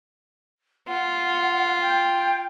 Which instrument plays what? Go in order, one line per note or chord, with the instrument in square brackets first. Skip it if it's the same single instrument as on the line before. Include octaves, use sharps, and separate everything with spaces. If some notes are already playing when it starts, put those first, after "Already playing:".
[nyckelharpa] F4 [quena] F#5
[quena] G5